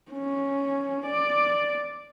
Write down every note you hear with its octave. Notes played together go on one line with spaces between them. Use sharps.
C#4
D5